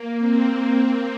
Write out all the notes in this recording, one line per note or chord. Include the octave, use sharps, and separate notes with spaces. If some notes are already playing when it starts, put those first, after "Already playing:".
Already playing: A#3
C4